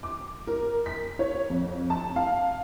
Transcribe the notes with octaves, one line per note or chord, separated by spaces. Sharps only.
D6
A#4
B6
C#5
F2
A5
F5